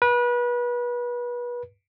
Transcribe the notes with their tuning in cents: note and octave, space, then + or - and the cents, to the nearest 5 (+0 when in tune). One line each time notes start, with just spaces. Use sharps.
B4 -30